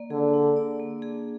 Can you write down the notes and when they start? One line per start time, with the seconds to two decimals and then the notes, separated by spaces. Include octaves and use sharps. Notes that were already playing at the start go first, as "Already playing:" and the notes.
Already playing: A#3 D5
0.10 D3 G#4
0.34 D4
0.56 D5
0.80 A#3
1.02 G#4